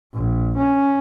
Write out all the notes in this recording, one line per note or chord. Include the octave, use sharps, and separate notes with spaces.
A#1
C#4